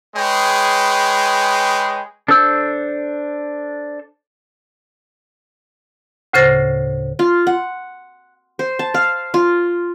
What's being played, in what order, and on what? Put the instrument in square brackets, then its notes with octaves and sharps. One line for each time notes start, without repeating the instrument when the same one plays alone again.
[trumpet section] G#3 G#4 B4 C#5 G5
[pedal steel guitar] D4 A4 C5 E6 G6
[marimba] D2 A2 C#3 C5 A6 A#6
[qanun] F4
F#5
C5
A5
F5
F4